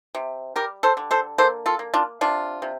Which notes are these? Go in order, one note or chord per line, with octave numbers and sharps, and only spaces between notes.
C3
G3 G4 A#4
A4 C5
D3
A4 C5
A#3 A4 C5
F4 A4
A#3
D4 F4
C3 D4 F4
C3